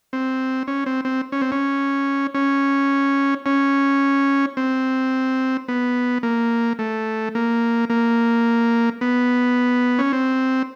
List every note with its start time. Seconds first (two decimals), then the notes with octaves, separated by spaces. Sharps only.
0.13 C4
0.67 C#4
0.86 C4
1.05 C4
1.32 C#4
1.42 C4
1.52 C#4
2.34 C#4
3.46 C#4
4.57 C4
5.68 B3
6.23 A#3
6.79 A3
7.35 A#3
7.90 A#3
9.01 B3
9.99 C#4
10.13 C4